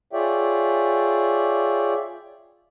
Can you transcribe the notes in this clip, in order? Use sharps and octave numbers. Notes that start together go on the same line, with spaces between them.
F4 G#4 C#5 D5 E5 G5